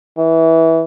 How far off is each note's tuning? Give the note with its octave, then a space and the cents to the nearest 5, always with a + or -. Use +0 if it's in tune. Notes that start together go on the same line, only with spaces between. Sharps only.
E3 -20